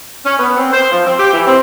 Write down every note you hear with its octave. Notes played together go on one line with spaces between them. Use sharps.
C#4
B3
C4
C5
F3
C4
G4
E3
C4